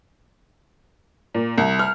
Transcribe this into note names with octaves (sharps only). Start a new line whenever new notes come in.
A#2
C2
F6